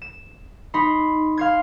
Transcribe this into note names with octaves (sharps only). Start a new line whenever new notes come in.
E7
D#4 B5 C6
F5 C6 G#6